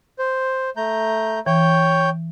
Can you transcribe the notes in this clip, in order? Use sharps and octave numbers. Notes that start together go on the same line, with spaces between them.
C5
A3 A#5 G6
E3 C#5 G5 G6